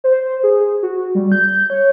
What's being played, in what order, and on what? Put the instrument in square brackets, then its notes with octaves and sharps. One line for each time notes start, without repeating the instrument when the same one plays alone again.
[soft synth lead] C5
G#4
F#4
G3
G6
C#5